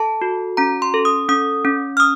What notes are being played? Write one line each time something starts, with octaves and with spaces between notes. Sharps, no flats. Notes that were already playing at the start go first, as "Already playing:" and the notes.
Already playing: A4 A5
F#4
C#4 A#5
C6
A4
D#6
C#4 D#6
C#4
F6
D#6